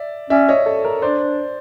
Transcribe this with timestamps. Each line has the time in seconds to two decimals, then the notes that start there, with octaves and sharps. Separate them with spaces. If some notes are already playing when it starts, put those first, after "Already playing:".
Already playing: D5 E5
0.30 C#4 D5 E5
0.48 C#5 D#5
0.66 A4
0.84 A#4
1.02 D4 C5 D5